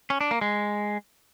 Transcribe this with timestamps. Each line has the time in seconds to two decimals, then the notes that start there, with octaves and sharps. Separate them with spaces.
0.10 C#4
0.21 D4
0.31 A#3
0.41 G#3